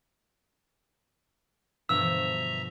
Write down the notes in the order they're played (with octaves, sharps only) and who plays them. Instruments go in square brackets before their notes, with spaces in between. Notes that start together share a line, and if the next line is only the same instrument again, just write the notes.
[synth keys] G2 B2 D3 [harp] F3 [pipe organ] E5 A#5 [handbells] E6